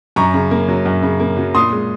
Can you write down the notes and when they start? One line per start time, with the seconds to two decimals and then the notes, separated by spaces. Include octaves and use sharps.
0.16 F#2 A#5 C#6
0.34 C#3
0.51 A#3
0.68 F#3
0.85 F#2
1.03 C#3
1.20 A#3
1.37 F#3
1.55 A#2 C6 D#6
1.72 G#3